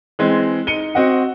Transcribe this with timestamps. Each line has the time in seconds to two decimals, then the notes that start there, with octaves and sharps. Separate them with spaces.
0.19 E3 G#3 C4
0.67 D#4 C#7 D#7 G7
0.95 C4 F#4 D#5 F#5